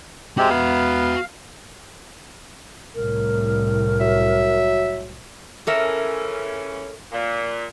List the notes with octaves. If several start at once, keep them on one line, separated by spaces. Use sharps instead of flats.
G#3 C4 F#4 G4 E5
B3 F5
C2 A2 A#4
F#3 E5
C#3 E3 C#4 A4 A#4 E5
A#2